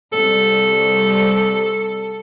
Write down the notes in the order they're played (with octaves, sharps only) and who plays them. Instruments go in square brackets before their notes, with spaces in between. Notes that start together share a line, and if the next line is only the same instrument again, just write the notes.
[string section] C2 [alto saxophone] A4